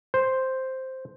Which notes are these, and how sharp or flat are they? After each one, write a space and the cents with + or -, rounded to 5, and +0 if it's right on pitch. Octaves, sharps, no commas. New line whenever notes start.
C5 +0